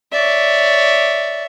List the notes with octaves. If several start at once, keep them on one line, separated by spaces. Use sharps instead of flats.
C#5 D5 E5